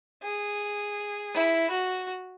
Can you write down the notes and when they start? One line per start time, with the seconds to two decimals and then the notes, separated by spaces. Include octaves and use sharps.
0.23 G#4
1.34 E4
1.70 F#4